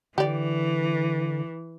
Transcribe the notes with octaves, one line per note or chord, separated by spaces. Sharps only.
D3 E3 G4 D5